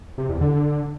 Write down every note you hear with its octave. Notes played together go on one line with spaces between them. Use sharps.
C3
E2
D3